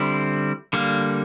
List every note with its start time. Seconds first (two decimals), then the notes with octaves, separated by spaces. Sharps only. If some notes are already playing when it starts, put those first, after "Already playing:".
Already playing: D3 G3 C4 E4
0.73 D3 G3 A#3